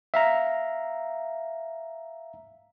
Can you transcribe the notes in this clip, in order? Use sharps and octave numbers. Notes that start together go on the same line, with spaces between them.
E5 F5 A#5